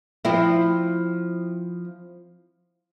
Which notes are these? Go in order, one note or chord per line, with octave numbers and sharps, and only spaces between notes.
F3 C4 E4